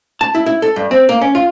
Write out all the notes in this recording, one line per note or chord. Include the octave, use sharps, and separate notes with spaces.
A5
E4
E4
A4
G2
C4
A#3
C#4
F4